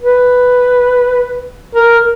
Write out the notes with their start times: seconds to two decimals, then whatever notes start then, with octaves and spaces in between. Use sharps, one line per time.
0.01 B4
1.75 A#4